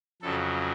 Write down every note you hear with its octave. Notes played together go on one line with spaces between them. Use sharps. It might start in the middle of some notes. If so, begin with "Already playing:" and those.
F2 C#3 F#3 A4